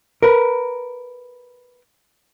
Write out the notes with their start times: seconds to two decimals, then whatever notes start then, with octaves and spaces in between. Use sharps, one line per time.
0.22 A#4 B4